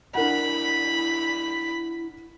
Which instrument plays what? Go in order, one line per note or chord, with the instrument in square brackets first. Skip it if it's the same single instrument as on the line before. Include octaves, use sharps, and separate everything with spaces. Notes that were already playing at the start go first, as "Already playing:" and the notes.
[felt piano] D4 A#4 F#5 [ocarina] E4 [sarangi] B5